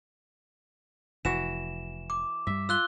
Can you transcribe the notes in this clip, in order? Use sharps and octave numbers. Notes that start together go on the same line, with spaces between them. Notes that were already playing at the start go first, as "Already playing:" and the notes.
F1 E3 F#4 E7
D6
G2 G3 E5
F4 E6 F#6 G7